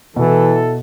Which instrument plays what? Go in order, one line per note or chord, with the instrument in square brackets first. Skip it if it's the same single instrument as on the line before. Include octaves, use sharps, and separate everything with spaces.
[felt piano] B2 [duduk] E3 [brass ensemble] E4 A4